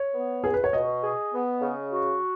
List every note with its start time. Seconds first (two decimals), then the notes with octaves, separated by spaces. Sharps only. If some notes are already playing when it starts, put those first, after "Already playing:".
Already playing: C#5
0.14 B3
0.44 C#2 G#4
0.54 B4
0.64 C#5
0.73 B2 D#5
1.03 G#4
1.33 B3
1.62 C#3
1.92 F#4